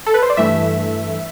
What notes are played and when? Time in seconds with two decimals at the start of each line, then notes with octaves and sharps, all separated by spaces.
0.06 A4
0.14 B4
0.22 C5
0.30 D5
0.37 G2 E3 A3 E5